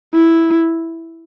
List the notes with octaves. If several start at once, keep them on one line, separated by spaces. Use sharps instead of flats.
E4